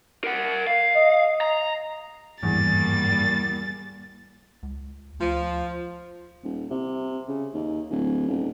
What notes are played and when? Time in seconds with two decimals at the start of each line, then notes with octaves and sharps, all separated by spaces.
0.24 A#4 F#5
0.67 F5
0.94 D#5
1.41 A#5
2.43 G#1 E2 G2 G3 A#3 A6
4.63 C#2
5.19 D2 F3
6.44 D#1
6.70 C3
7.28 C#3
7.54 D#2
7.91 D1
8.28 D#1